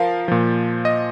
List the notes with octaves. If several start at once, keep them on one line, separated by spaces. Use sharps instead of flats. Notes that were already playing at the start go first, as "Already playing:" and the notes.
Already playing: F3 A#4 F5
A#2 F3
D#5